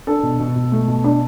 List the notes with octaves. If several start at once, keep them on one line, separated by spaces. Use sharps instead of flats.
D4 A4
B2
B2
B2
A3
B2
D4